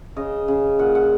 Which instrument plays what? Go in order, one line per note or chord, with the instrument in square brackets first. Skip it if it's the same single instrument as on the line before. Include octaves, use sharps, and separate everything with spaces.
[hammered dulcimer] C#3 D#5
C#3
A#2 F#5
F#5